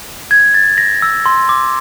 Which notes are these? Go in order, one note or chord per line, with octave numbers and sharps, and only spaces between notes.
G#6
A6
A#6
E6
C6
D6